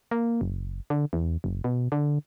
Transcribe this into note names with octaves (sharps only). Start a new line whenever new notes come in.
A#3
F#1
D3
E2
F#1
B2
D3